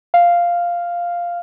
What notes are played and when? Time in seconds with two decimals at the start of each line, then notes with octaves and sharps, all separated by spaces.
0.14 F5